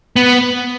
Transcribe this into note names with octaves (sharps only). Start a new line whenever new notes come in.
B3